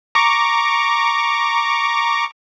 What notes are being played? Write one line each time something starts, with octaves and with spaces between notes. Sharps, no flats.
A#5 C#6 D6